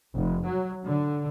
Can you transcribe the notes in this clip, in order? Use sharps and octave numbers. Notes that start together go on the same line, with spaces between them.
F1
F#3
D3